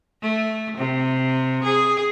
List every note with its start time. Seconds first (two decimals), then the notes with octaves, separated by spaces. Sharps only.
0.22 A3
0.77 C3
1.64 G#4